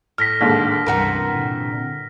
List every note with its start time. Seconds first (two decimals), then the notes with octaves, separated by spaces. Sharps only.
0.18 A2 F6 A#6 B6
0.41 D#2 G#2 D3
0.86 C#2 G2 C3 E3 A#4 F#5
1.33 A#2 D3